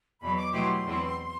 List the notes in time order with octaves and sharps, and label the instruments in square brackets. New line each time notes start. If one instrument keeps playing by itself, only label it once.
[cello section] E2 B2 F#3 [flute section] B5
[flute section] D6
[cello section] B2 F#3 A3 E4 G4 [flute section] C6
[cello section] E2 B2 F#3 C4 E4